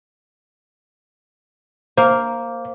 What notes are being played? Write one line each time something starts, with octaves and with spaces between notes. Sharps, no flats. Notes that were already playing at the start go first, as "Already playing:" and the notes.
A#3 C5